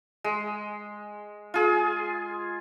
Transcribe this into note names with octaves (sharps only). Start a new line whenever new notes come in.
G#3
F4 G#4